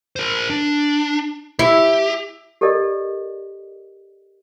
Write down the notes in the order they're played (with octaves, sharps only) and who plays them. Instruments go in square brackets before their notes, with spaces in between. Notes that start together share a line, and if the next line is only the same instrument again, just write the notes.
[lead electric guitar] A#4 C5
D4
[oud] E4 [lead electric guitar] G4
[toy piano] G4 A4 A#4 D5 D#5